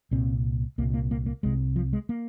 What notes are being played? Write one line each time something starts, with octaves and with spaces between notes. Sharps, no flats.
C2 A#2 C4
C2 A#2 A#3
A#3
A#3
A#3
C2 C3 G#3
F3
G#3
A#3